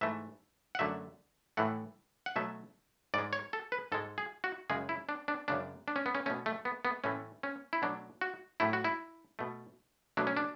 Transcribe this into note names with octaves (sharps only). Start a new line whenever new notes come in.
G#2 E3 A3 E5
F#5
F#2 D3 F#3 A3 E5
A2 E3 A3 F#5
F#5
B2 F#3 A3 E5
G#2 G#3 D5
C#5
A4
B4
G#2 G#3 A4
G#4
F#4
F#2 C#3 G#3 G#4
E4
D4
D4
F#2 C#3 G#3 D4
D4
C#4
B3
C#4
B2 A3 C#4
A3
B3
B3
A2 E3 A3 C#4
C#4
E4
B2 F#3 A3 D4
F#4
A2 F#3 A3 E4
F#4
E4
B2 A3
B2 F#3 A3 D4
C#4
D4